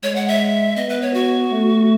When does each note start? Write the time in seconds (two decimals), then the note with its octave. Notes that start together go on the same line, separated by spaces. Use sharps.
0.02 G#3 C#5
0.15 F#5
0.28 E5
0.76 B3 D#5
0.89 B4
1.01 C#5
1.14 F#4
1.51 A3